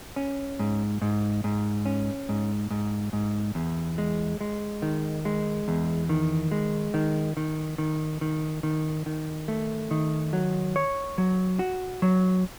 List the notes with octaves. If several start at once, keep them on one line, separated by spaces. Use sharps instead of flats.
C#4
G#2
G#2
G#2
C#4
G#2
G#2
G#2
E2
G#3
G#3
D#3
G#3
E2
D#3
G#3
D#3
D#3
D#3
D#3
D#3
D#3
A3
D#3
F#3
C#5
F#3
F#4
F#3